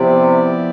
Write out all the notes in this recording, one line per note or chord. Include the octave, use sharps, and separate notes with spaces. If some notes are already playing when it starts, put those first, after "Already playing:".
Already playing: C3 F3 B3 E4 G4 D5